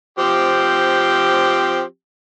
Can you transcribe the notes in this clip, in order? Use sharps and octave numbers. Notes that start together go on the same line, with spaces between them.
F3 C4 G4